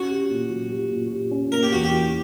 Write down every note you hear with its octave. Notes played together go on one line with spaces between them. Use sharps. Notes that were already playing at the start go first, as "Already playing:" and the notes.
Already playing: C#4 F#4
G4
A#2
F#3
G4
A#2
G4
C#4
A#3 A#4
G4
E2 F#4
G4
E4